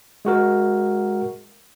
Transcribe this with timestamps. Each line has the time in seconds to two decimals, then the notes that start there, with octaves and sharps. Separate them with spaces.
0.25 G#3 F#4 A#4